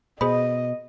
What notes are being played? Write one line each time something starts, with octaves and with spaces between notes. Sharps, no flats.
B2 G#4 C5 D#5 B5